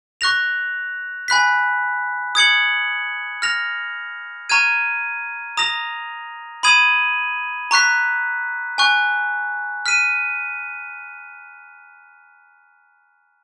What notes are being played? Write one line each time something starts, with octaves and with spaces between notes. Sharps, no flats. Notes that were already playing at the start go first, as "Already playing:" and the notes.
C#6 F#6 A#6 F7
G#5 B5 F#6 B6
D#6 G#6 C#7 F#7
F6 A#6 F7
A#5 C#6 F6 G#6 D#7
A#5 D#6 A#6 F7
B5 D#6 G#6 D#7 F#7
A#5 C#6 F#6 B6
G#5 C#6 F#6
F6 B6 D#7